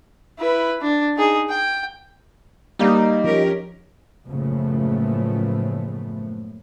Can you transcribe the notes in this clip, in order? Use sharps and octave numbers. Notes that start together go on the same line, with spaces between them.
E4 B4
D4
D#4 G#4
G5
G3 A#3 D#4
F3 C#4 G4 A#4
F#1 A2 C#3 F3 A3 B3